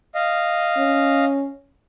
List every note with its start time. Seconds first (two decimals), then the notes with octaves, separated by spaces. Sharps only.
0.15 D#5 F5
0.78 C#4